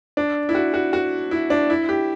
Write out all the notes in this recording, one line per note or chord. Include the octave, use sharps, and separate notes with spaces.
D4
E4
F#4
F#4
F#4
E4
D4
E4
G4